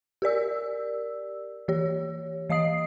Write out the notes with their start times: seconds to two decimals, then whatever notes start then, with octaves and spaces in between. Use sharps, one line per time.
0.22 G4 A#4 D5 E6
1.68 E3 G4 C#5
2.50 E3 D#5 F5 D#6 C7